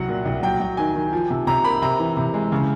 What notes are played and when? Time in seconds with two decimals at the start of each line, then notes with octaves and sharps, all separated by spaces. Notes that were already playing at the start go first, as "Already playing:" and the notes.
Already playing: C2 F#3 F#5
0.08 A#2
0.26 C2
0.43 F#3 G5
0.60 F#3
0.77 D#3 G#5
0.95 D#3
1.13 F3
1.30 C3
1.47 C3 A#5
1.64 A#3 B5
1.82 C3 A#5
1.99 E3
2.17 C3
2.34 G#3
2.52 C#3